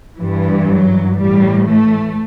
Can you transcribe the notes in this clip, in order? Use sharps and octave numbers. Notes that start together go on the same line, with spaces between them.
G2 E3
F#3
A2 E3 G3
A3